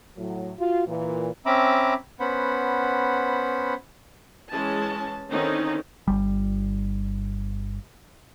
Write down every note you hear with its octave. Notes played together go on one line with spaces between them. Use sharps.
A2 F#3
F4 F#4
A#2 E3
C4 C#4 E5 A#5 B5 D6
B3 C#4 C5 F#5 B5
E3 G#3 C#4 A5
D3 D#3 C4 C#4 D#4 E4
G1 G3